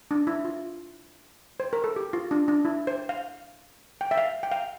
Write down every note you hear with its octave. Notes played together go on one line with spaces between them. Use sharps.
D4
E4
F4
C5
A#4
A4
G4
F4
D4
D4
E4
C5
F5
G5
E5
F5
G5
F5